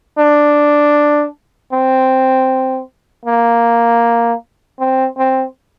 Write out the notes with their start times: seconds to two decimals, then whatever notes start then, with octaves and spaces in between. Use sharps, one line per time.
0.18 D4
1.72 C4
3.25 A#3
4.79 C4
5.18 C4